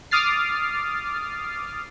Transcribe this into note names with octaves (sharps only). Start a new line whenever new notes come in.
D6 D#6 F6 A6 C7